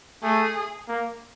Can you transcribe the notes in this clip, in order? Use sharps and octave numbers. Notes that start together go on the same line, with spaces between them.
A3 G#4
A#3